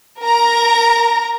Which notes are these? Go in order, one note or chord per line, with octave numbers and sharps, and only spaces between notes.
A#4 A#5